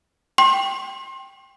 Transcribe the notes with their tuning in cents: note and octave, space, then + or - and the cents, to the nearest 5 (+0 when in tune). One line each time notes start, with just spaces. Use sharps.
G5 +0 C6 +35